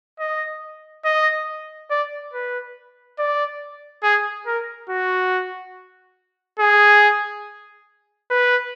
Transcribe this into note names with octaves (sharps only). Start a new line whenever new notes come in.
D#5
D#5
D5
B4
D5
G#4
A#4
F#4
G#4
B4